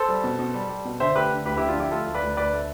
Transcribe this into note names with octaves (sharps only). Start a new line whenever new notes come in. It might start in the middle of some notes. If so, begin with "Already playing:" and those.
Already playing: A4 C5
G3
B2
B2
G3
G3
B2
D3 C5 E5
A3 G4 B4
D3
D2 G4 B4
D3 E4 G4
D4 F4
F3 E4 G4
A3 F4 A4
D2
B4 D5
D2
D2 B4 D5
A3